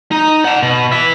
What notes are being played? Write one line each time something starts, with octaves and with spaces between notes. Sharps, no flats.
D#4
F#5 A5
B2
B4 E5